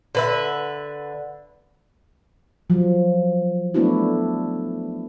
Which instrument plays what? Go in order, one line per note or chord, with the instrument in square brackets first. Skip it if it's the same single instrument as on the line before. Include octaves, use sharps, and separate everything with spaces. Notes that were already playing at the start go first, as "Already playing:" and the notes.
[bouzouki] D3 B4 E5
[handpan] F3 F#3
A3 B3 D4 E4 F#4